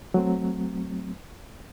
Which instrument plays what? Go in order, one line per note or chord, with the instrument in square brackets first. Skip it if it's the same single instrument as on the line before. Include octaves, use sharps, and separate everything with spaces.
[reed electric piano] F#3 A3 C4